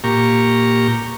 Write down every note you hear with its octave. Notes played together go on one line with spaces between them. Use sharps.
A#2 G4 A#5 C#6